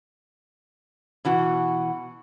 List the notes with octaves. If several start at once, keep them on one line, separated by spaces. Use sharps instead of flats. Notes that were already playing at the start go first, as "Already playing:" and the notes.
B2 E3 F#4